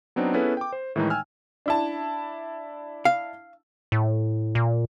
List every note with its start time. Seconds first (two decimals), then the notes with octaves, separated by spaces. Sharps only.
0.16 F#3 B3 C4 D4 D#4
0.34 B3 C#4 E4 G#4 A4 B4
0.57 G5 D6
0.73 C5
0.96 A2 D#3 E3 G#3 A3 D#4
1.10 G5 G#5 E6 F6
1.66 D4 E4 A5
3.05 F5
3.92 A2
4.55 A#2